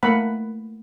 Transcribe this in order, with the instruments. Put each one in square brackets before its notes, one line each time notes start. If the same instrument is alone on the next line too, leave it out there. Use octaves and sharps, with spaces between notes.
[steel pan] A3 A#3 B4 F#5 B5